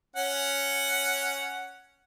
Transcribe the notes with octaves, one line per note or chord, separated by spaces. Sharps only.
C#4 F#5